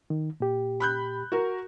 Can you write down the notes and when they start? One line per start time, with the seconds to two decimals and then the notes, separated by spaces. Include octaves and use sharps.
0.10 D#3
0.40 A#2 G4
0.80 B5 F#6 G6
1.32 F#4 A#4